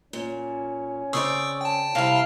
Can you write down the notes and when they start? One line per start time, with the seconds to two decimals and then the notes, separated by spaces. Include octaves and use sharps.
0.13 A#2 C#4
1.13 C#3 C4 D5 C#6 D#6 E6
1.61 G5 A5
1.95 C3 G3 E4 F5